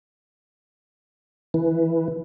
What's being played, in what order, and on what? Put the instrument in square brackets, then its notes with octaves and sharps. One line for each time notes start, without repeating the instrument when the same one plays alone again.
[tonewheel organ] E3